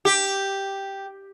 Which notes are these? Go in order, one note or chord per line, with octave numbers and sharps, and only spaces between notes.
G4